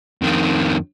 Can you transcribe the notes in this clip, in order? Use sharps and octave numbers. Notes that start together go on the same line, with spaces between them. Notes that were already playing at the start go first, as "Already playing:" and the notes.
F2 D#3